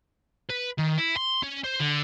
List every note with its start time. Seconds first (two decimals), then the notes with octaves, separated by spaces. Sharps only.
0.50 B4
0.79 D#3
0.98 E4
1.17 C6
1.43 C#4
1.64 C5
1.80 D3